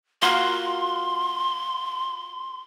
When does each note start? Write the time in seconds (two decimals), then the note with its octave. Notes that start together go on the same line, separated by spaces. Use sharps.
0.22 A#3 F4 F#4 C6